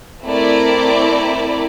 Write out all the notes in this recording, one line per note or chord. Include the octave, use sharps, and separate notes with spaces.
A3 C4 E4 A#4 D5